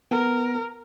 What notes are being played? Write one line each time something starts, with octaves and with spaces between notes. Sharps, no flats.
B3 A#4